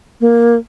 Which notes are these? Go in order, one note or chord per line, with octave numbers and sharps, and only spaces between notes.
A#3